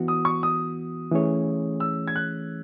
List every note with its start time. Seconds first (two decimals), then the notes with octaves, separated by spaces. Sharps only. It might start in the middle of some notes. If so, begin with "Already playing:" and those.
Already playing: E3 B3 F#4
0.08 D#6
0.25 C#6
0.43 D#6
1.12 E3 A3 C#4 G#4 C#5
1.80 E6
2.08 G#6
2.16 F#6